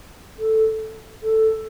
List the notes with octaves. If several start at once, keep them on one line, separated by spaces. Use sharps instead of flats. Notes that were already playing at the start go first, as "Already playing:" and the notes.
A4
A4